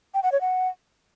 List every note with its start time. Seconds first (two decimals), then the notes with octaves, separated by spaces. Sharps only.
0.14 G5
0.23 F#5
0.32 C#5
0.41 F#5